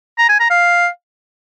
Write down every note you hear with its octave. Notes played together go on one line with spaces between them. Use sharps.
A#5
G#5
A#5
F5